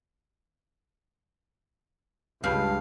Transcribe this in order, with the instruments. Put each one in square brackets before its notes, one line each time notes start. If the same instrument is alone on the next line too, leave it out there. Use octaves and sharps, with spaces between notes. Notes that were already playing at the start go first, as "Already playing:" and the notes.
[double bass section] C#2 [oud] G2 [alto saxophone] F5